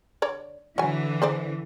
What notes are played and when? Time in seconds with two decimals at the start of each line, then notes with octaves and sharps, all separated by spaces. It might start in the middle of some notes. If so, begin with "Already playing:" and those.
0.22 D3 C#5 D5
0.78 D3 E3 F#3 G#5
1.22 G#4 C5 D5